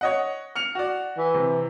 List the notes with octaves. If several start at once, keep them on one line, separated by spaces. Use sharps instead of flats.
C#5 D#5 F#5
F6 C#7 F7
F#4 D5
E3
C3